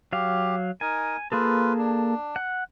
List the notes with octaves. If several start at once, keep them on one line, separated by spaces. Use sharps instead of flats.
F#3 G4 F5
D#4 A#4 G#5
A#3 F4 G#4 A4 B4
D4
F#5